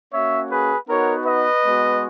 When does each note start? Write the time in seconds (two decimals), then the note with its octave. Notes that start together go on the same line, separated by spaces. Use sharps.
0.13 A#3 C#4 F#4 C#5 E5
0.50 G#4 B4
0.87 B3 D#4 F#4 A#4 C#5
1.25 B4 D#5
1.64 G#3 B3 F#4